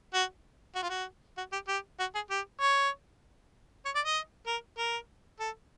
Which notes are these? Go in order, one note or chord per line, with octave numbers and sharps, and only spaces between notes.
F#4
F#4
F4
F#4
F#4
G4
G4
F#4
G#4
G4
C#5
C#5
D5
D#5
A#4
A#4
A4